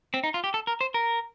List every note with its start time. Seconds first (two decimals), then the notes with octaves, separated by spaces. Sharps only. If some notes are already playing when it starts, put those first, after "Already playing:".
0.14 C4
0.24 D#4
0.34 F4
0.44 G4
0.54 A4
0.67 A#4
0.81 C5
0.94 A#4